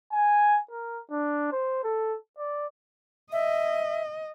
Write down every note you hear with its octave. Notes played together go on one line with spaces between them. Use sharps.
G#5
A#4
D4
C5
A4
D5
D#5 E5